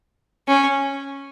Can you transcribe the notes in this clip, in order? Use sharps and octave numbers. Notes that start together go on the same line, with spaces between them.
C#4